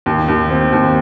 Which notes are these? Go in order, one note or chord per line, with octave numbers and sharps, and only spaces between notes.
D#2
D#2
C4
D#2